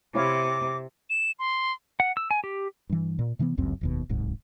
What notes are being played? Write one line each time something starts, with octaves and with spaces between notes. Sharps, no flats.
C3 E4 C#5 F5 D6
E7
C6
F#5
E6
G#5
G4
G2 E3
A#2
C3 E3 A#3 B3
G1 C#2 F#2 C4
F1 D#2 B2
D1 C2 G#2